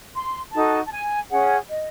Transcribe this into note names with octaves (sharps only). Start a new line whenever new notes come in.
C6
D#4 F#4 A4 A5
A5
G#5
C#4 G#4 C#5 F#5
D#5